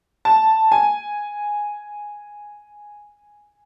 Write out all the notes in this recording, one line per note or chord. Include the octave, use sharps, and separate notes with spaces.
A5
G#5